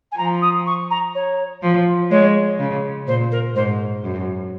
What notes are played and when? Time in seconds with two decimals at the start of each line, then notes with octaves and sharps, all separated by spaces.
0.11 G#5
0.17 F3 A#5
0.42 D#6
0.66 C#6
0.90 A#5
1.14 C#5
1.63 F3
2.11 G#3 C#5
2.59 C#3
3.07 A#2 C5
3.31 A#4
3.55 G#2 C5
4.04 F#2